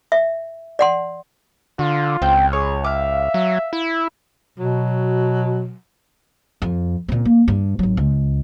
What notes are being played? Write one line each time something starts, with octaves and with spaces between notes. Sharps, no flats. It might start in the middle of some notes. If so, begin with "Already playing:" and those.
E5
D5 F#5 C6
D3 F4
C#2 C4 G5
G#4 C#5
E5 F5 D6
F#3
E4
B2 F#3
F2
A#2 C4
A#3
G2
G#1 F#3
C#2